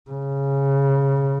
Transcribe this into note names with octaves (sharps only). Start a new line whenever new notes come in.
C#3